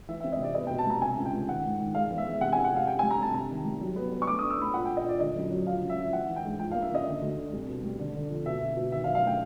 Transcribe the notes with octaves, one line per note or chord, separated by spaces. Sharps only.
E3 E5
E5
C4
D#5
C3 D5
B3 D#5
G5
B2
A5
G3 A#5
C3 G#5
C#2
G5
C#2
D#3 F#5
G#2
D#3
G#3 F5
E2
E5
E2
C3 F#5
G#5
E3
F#5
C3 F5
C3 G5
G#5
G3
A#5
C3 A5
C3 A#5
D#3
G3
F#3
B3
B3
C#6
A3 D6
D#6
D4
E6
A2 B5
A#2 F#5
G5
A#2
D#5
A#2 D5
D3 D#5
F#2
F#3
F3 F5
C#3
E5
F3
E3 F#5
E3
G5
G#2
F3 G5
F5
A#3
E5
C#3 D#5
D3
D2
D3
C2
B2
G3
D3
D3
F2
B2 E5
B2
B2
D#3 E5
F5
F#3
F5
A3 G5